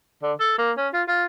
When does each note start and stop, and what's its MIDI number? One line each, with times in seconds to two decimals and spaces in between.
0.23 0.33 50
0.40 0.57 69
0.58 0.72 58
0.77 0.88 61
0.94 1.03 65
1.08 1.25 65